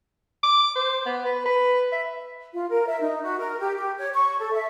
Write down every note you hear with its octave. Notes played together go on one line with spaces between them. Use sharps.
D6
C5
B3
B4
B4
E5
F4
A#4
E5
D#4
F#4
A#4
G4
G4
C#5
C#6
A4
E5